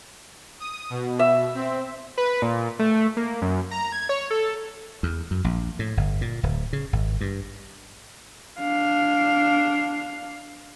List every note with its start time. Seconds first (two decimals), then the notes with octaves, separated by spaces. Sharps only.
0.60 D#6
0.90 B2
1.19 E5
1.55 C4
2.18 B4
2.42 A#2
2.79 A3
3.17 A#3
3.42 F#2
3.71 A#5
3.92 G#6
4.09 C#5
4.30 A4
5.03 E2
5.31 F#2
5.44 A#1
5.79 A2
5.97 G1
6.21 A#2
6.43 D1
6.73 C#3
6.93 G#1
7.21 G2
8.59 D4 F5